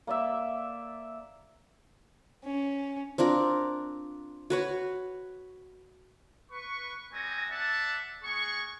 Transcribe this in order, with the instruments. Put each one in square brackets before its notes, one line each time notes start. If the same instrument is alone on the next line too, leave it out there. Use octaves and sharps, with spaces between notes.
[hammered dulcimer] A#3 D5 E5
[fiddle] C#4
[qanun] C4 D4 F4 A#4
F#4 B4 C#5
[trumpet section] B4 C#6
G3 C4 F#4 D#5 G#5 A#5
D5 E5 F#5 A5
A#3 G#4 F#5 C#6